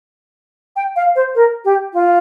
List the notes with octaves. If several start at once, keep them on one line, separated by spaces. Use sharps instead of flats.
G5
F5
C5
A#4
G4
F4